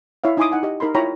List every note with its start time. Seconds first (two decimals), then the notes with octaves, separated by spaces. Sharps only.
0.24 E4 C#5 E5 F5
0.37 D#4 E4 G#5 C6 D6 D#6
0.51 D#4 F#5 G#5 D6
0.63 G4 D#5
0.80 D#4 A#4 B5 C6
0.95 E4 F4 C#5 G5 A#5 B5